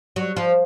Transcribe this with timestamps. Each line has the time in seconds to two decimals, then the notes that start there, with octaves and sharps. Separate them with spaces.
0.16 F#3
0.37 F3